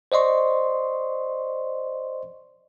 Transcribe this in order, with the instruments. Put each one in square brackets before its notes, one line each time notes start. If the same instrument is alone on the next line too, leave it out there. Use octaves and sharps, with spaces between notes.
[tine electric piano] C5 D5 D#5 C6 C#6